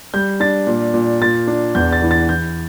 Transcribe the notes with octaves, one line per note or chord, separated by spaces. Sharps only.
G3 G6
D4 A6
A#2
A#2
A#2 A6
D4
E2 G6
A6
E3
A6
E3 G6